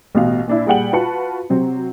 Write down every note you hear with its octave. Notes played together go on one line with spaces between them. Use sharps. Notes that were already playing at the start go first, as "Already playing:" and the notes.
A1 B2 F5
A#2 D4 E4
A#2 G3 G#4 F#5 G5 F#7
F4 F#4 B4 A5 C#7
C3 F#3 C4